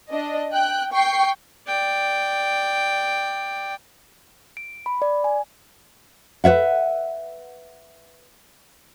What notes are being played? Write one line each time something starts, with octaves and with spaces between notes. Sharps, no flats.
D4 D#5
G5 F#6
G5 C#6 C7
D5 G5
D7
B5
D5
G#5
B4 C#5 E5 F#5